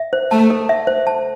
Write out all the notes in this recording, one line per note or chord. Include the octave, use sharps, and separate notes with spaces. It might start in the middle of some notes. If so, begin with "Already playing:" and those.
Already playing: E5
C5
A3 A5
A4
E5
C5
A5